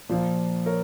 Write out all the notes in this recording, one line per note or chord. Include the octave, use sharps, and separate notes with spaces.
A#2 F3 A#3
A#4 C#5